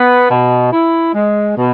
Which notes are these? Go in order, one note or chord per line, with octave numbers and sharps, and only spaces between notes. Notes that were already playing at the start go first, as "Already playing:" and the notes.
Already playing: B3
B2
E4
G#3
B2